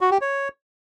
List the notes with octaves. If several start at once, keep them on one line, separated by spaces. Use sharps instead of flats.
F#4
G4
C#5